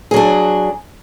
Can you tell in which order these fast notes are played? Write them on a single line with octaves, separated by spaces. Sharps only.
G#4 F#3 D4